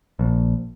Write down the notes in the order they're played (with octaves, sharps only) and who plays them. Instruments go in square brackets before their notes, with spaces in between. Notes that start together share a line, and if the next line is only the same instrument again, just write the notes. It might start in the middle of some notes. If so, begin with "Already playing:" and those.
[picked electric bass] A#1